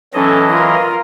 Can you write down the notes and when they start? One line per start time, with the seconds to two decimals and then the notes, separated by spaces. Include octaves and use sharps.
0.14 E3 F#3 C#4 A4 D#5
0.51 F4 A#4